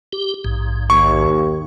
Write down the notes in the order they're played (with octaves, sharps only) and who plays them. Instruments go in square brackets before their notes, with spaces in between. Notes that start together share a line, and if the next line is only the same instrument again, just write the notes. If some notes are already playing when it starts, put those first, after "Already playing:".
[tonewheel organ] G4
A#1 G#2
[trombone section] D#2 [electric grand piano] C#6